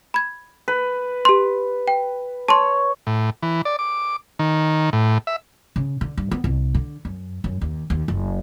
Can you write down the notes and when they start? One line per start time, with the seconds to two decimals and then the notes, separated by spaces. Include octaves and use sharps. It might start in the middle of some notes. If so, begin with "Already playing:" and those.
0.14 B5 G#6
0.68 B4
1.25 G4 C6
1.88 G5
2.48 C#5 A5 C6
3.07 A2
3.43 E3
3.65 D5
3.79 D6
4.39 D#3
4.93 A2
5.27 E5
5.76 C#3
6.01 D3
6.17 G2
6.31 B3
6.44 C2
6.75 D3
7.05 F#2
7.44 F#2
7.61 D#2
7.90 D#2
8.08 F#1